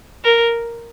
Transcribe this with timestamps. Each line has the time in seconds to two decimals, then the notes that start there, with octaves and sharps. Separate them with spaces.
0.24 A#4